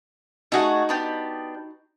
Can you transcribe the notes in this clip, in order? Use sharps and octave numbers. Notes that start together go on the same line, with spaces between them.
A3 D#4 F#4 G#4 F#5
B3 D4 G4